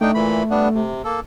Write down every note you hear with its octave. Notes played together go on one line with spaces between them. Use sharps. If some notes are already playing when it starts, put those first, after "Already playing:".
A3 D4 D#4 G5
A#2 E3 B5
G3 B3 D4
C3
A#3 A4